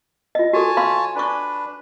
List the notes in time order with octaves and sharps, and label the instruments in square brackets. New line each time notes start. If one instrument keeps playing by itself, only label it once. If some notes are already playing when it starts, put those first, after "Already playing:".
[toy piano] F4 D#5
[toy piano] F#4 A4 [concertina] C#5 G#5 A5
[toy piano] F5 B5 C6
[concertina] D4 B4 [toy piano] G#5 C#6